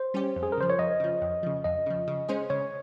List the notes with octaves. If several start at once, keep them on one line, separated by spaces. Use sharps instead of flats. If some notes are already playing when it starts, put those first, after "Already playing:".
Already playing: C5
G3 C#4 G4
F2
G#4
A#4
C#3 F3 C5
C#5
F2 D#5
C#3 F3
F2
C#3 F3
F2 D#5
C#3 F3
C#3
G#3 C#4 G#4 C5
C#3 C#5